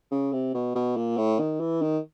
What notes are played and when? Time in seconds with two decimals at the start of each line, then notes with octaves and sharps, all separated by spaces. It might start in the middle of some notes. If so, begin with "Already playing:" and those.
0.11 C#3
0.33 C3
0.54 B2
0.75 B2
0.97 A#2
1.18 A2
1.39 D#3
1.60 E3
1.82 D#3